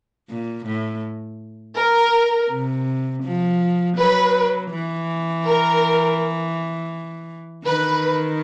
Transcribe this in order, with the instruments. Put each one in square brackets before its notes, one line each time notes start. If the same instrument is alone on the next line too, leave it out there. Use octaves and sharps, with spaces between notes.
[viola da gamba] A#2
A2
[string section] A#4
[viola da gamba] C3
F3
[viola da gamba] F#3 [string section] B4
[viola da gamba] E3
[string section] A#4
[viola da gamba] D#3 [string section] B4